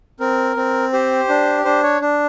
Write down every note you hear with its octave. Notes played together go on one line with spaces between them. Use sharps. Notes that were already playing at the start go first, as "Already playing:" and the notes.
C4 A#4
C4
G4 C5
D4
D4 C5
C#5
D4